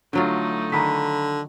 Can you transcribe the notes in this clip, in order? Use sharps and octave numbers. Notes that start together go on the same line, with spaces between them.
D3 F#3 A3 D#4 F4
D3 D#3 A#5 B5 B6